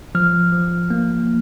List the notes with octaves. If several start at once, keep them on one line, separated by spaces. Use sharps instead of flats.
F3 F6
F3
A#3